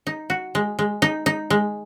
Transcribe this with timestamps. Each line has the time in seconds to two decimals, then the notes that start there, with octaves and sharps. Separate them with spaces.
0.07 D#4
0.30 F#4
0.55 G#3
0.79 G#3
1.02 D#4
1.26 D#4
1.50 G#3